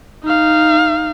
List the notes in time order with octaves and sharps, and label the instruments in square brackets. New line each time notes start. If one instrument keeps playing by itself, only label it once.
[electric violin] D#4 F5